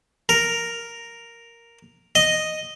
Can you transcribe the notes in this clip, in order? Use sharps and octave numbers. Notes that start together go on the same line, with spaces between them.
A#4
D#5